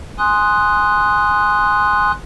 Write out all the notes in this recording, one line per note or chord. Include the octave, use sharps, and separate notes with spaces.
G#5 C6 D#6 F#6